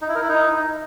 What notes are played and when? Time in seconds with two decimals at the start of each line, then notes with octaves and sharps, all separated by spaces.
0.02 D#4
0.08 E4
0.15 A#4
0.22 E4
0.29 D#4